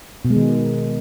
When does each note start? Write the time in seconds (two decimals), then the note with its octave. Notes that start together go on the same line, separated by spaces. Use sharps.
0.25 B2
0.30 G#3
0.36 D#3